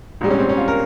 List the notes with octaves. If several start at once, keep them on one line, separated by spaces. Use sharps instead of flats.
A#1 G#2 G3
C#4
C4
C#4
F4
A#4